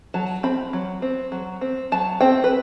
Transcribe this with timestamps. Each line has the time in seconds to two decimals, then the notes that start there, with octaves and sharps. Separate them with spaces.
0.14 F#3 A5
0.43 C4 B5
0.73 F#3
1.02 C4
1.32 F#3
1.61 C4
1.92 F#3 A5
2.20 C4 G5
2.44 B4